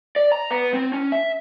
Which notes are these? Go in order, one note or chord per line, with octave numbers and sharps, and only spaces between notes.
D5
A#5
B3
C4
C#4
E5